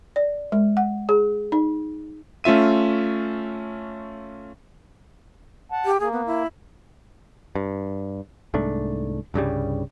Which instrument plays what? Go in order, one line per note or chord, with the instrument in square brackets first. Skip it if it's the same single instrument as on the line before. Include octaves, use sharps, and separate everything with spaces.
[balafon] D5
G#3
F#5
G#4
D#4
[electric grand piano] A3 C#4 F4 E5 D#7
[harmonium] F#5 A5
[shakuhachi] G4
[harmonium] A#3 [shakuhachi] G#4
[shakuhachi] B3
E4
[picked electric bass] G2
C2 G#2 A3 D4
C2 G2 C#3 G3